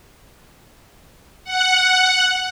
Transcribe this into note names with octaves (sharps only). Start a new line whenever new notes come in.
F#5